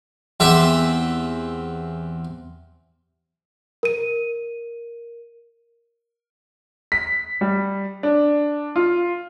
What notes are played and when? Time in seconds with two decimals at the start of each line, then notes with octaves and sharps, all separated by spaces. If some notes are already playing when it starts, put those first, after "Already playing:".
0.40 E2 C4 G4 E5
3.83 A#4 D#7
6.92 B6
7.41 G3
8.03 D4
8.76 F4